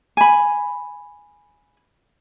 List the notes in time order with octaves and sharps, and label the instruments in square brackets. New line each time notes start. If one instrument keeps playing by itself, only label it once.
[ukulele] G#5 B5